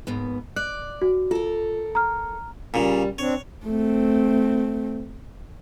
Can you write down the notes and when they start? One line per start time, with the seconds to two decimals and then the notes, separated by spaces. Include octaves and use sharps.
0.07 D#2 G#2 B3
0.56 D5 F#6
1.02 F#4
1.31 F4 A4 A#4
1.95 A#5 F6
2.74 A#2 C#3 G3
3.18 C4 D4 C#5
3.65 A3 C4